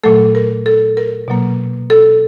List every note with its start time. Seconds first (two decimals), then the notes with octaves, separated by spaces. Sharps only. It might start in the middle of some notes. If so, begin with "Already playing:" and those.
0.04 A#2 F#3 A3 A4
0.35 A#4
0.66 A4
0.97 A#4
1.28 B2 F#3 A#3
1.90 A4